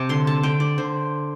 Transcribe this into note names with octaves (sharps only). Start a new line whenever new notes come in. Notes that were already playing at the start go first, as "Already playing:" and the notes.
Already playing: C3 G5 A5
D3 C6
A5
D3 G5
D5
D3 C5